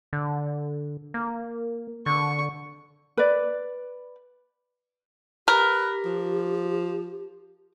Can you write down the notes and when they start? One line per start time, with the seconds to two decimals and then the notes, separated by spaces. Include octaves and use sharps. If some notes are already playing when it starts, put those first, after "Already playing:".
0.13 D3
1.14 A#3
2.06 D3 C#6
3.17 B4 D5
5.48 G4 A#4 B4
6.05 F3